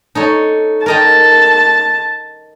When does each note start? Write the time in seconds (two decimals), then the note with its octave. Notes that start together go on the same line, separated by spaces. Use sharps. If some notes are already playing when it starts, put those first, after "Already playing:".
0.15 D#4 A4 C#5
0.86 A#4 D#5 G5 A5